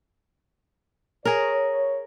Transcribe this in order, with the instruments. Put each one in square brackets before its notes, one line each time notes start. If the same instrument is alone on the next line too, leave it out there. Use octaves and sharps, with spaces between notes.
[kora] G#4 A#4 [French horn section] C#5